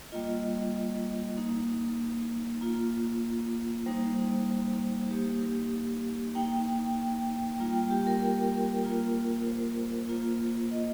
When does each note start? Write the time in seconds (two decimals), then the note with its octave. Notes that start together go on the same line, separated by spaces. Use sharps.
0.12 G3 A#3 F4 D#5
1.36 A#3 D#4
2.61 A#3 F4
3.86 G3 A#3 D#4 C5
5.11 A#3 D#4 G4
6.35 A#3 D#4 G5
7.59 G3 A#3 F4 G5
7.75 G5
7.91 G4
8.07 A#4
8.22 A#4
8.84 A#3 F4
9.47 C5
10.09 A#3 F4
10.71 D#5